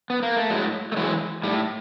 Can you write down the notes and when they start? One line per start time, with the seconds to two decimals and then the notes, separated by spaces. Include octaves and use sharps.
0.10 B3
0.23 A#3
0.37 A3
0.50 A2 F#3 G#3
0.92 A3
0.96 E3 F#3 G#3
1.43 A2 G3